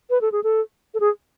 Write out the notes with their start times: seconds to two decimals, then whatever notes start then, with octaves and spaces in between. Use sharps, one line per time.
0.10 B4
0.21 A4
0.32 G#4
0.44 A4
0.94 A4
1.00 G#4